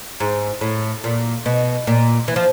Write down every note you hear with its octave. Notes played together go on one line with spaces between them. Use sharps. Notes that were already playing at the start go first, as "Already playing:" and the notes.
G#2
A2
A#2
B2
A#2
E3
F3